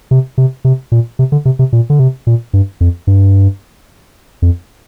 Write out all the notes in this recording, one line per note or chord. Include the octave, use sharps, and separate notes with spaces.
C3
C3
C3
A#2
C3
D3
C3
C3
A#2
D3
C3
A#2
G2
F2
G2
F2